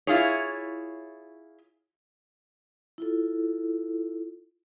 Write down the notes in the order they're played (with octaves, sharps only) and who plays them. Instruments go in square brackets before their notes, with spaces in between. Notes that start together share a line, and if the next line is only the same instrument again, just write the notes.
[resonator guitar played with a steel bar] E4 F4 G#4 C#5
[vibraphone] E4 F4 A4